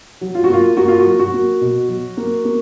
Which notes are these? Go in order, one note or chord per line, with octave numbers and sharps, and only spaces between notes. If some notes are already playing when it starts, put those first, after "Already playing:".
F#3
F4
F#4
A#3 F4
A#3 F#4
F4
F#4
F#3
F#4
A#3
B2
F#3
A#3
A#3